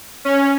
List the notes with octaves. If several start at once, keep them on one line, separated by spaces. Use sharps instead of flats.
C#4